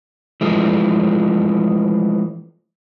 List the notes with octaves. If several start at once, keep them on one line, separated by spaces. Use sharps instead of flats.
E3 F3 G#3 A3